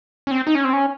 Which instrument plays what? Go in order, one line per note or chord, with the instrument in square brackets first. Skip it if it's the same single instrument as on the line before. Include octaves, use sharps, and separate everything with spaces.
[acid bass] C#4
C4
D#4
C#4
C4
C#4